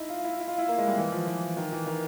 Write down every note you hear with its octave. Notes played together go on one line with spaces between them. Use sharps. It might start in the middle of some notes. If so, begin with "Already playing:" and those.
Already playing: D#4 E4
F4
E4
E4
F4
E4
A#3
G#3
G3
E3
F3
E3
D#3
E3
D#3